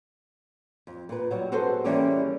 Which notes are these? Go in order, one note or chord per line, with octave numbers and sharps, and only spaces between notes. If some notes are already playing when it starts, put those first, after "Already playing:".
F2
A#2 B4
F#3 G3 F#4
F#4 G#4 A4 B4 C5
E3 G3 A#3 C#4 G#4 D5